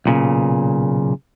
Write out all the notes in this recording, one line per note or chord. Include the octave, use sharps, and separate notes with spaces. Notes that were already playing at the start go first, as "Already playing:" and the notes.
B1 A#2 C#3